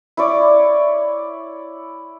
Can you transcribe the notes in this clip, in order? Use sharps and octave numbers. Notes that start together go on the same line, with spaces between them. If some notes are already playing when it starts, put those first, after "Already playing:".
E4 C#5 D5